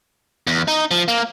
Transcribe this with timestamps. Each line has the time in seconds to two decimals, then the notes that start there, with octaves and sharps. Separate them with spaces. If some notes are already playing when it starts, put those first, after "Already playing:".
0.47 E2
0.68 D#4
0.91 F3
1.08 A#3